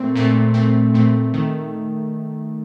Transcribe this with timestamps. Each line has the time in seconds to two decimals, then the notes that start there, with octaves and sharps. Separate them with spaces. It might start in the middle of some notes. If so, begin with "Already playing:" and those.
Already playing: A#2 A3 C4
0.15 A#2 A3 C4
0.54 A#2 A3 C4
0.94 A#2 A3 C4
1.34 D#3 A3